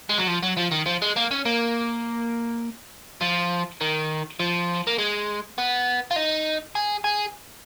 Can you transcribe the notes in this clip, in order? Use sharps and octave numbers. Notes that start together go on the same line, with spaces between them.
G#3
F#3
F3
F#3
F3
D#3
F3
G#3
A#3
C#4
A#3
F3
D#3
F3
A#3
G#3
B3
F4
D#4
G#4
G#4